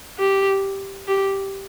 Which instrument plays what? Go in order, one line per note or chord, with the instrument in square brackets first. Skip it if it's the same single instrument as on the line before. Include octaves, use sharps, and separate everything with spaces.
[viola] G4
G4